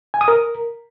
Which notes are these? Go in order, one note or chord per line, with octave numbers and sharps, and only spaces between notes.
G#5
D#6
A#4